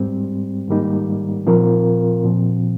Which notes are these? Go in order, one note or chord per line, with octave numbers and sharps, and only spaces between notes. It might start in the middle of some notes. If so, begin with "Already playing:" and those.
Already playing: G#2 G3 C4
G#2 D#3 G3 A#3 D#4
A#2 F3 C4 F4 A#4
A#2 F3 C4